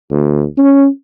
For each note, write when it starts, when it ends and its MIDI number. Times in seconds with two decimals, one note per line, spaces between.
0.11 0.44 38
0.58 0.87 61